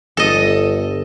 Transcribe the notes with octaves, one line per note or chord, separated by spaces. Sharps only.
G1 A4 D#5